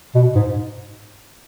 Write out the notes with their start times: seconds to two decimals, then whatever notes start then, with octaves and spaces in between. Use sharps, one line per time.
0.15 B2
0.35 G#2